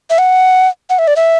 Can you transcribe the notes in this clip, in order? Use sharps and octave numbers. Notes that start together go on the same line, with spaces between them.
E5
F#5
F#5
E5
D5
E5